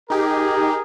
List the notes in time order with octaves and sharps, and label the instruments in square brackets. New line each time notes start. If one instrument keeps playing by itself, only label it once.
[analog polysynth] D#4 G4 [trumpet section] G#4 A#4